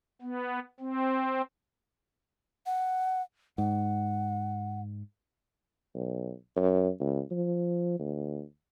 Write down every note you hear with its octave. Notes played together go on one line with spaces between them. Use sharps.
B3
C4
F#5
G#2 F#5
B1
F#2
C#2
F3
D2